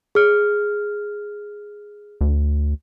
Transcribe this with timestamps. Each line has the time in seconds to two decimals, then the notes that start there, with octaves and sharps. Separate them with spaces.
0.15 G#4 F6
2.21 D2